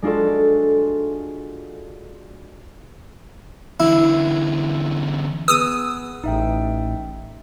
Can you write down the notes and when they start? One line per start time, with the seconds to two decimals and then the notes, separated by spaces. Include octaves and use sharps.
0.02 G#3 D4 F4 F#4 A4
3.80 E2 D3 E4
5.48 B3 G#4 B4 D#6 E6 D#7
6.24 A1 D#4 E5 G5